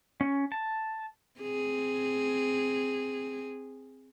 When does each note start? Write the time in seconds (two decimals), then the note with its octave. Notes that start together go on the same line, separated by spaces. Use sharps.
0.21 C#4
0.52 A5
1.41 C4 G#4